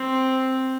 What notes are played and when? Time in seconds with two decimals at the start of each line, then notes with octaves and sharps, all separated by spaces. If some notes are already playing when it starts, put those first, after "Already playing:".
Already playing: C4